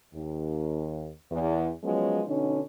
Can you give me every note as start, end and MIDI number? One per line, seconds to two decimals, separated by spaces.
0.14 1.09 39
1.29 1.68 40
1.83 2.20 53
1.83 2.20 54
1.83 2.20 56
1.83 2.20 59
1.83 2.20 61
2.26 2.60 47
2.26 2.60 50
2.26 2.60 61
2.26 2.60 63